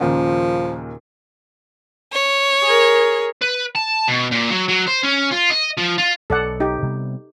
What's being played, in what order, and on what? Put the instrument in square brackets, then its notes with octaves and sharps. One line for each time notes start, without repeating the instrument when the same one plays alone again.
[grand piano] D#2 A#2 C#3 [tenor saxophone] F3
[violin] C#5
[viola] G#4 A#4
[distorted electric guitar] B4
A5
B2
A#2
F#3
F#3
C5
C#4
F4
D#5
F3
F4
[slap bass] B1 [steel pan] A4 D5 F#5
[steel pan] D#4 G4
[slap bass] C3 G3 B3